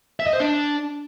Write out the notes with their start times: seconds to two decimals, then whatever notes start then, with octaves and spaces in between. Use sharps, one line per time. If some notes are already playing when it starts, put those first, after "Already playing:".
0.20 E5
0.27 D#5
0.33 C5
0.40 D4